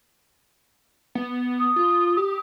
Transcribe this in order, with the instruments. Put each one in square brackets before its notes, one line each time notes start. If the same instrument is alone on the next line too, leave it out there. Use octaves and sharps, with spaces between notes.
[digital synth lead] B3
[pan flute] D#6
[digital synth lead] F4
G4